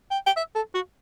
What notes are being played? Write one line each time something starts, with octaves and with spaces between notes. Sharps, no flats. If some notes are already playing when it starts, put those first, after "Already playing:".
G5
G5
E5
A4
F#4